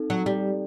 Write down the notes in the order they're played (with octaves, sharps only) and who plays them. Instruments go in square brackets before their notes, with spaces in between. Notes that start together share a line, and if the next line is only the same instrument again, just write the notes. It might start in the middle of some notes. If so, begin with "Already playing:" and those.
Already playing: [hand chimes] C4 D#4 A4
[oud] F#3
G3